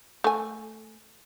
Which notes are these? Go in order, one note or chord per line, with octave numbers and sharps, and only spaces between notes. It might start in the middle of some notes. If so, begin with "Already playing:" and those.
A3 G#5